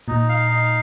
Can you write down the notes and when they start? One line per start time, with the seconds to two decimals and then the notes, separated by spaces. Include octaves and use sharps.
0.08 A#2 D#4
0.29 F5
0.51 D#4